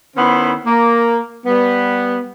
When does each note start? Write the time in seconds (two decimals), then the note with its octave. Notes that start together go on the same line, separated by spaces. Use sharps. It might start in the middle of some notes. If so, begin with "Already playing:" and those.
0.17 D#3 B3 C#4 E4 C5
0.66 A#3
1.46 G3 B3